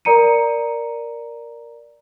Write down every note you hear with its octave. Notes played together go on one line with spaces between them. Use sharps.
A#4 D5 A#5 C#7 D#7